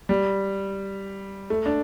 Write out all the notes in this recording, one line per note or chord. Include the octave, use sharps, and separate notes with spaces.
G3
A3
D4